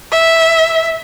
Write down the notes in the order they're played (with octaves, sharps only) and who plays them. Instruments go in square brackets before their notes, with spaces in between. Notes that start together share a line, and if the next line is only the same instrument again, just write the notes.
[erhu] E5